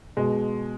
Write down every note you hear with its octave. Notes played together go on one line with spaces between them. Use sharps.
B2 G#3